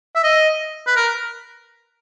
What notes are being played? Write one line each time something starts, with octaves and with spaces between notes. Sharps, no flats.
E5
D#5
B4
A#4